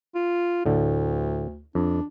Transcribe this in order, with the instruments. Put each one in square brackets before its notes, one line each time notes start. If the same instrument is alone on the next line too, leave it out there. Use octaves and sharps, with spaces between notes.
[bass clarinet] F4
[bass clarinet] D2 [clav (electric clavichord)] A2 D3
[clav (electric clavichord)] F2 [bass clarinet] D4